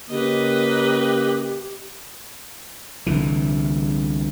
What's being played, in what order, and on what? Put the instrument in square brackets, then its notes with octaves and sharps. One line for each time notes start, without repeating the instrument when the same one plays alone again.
[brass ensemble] C#3 A#3 [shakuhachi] G4 [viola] B4 D#5
[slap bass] C2 D3 E3